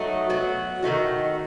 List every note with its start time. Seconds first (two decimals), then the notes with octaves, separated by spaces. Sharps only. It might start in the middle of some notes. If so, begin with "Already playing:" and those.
Already playing: F#3 A3 D#4 F#4
0.30 F#3 B3 F#4
0.83 D#3 A3 D#4 F#4